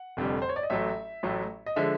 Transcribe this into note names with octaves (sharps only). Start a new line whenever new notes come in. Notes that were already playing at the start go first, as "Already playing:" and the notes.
Already playing: F#5
F1 F2 D3 G3
C5
C#5
D5
D#5
A1 A2 F#3 A3 E5
A1 A2 F#3 A3
D#5
D3 F3 G#3 E5